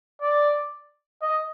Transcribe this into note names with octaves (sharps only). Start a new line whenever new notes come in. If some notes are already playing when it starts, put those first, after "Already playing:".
D5
D#5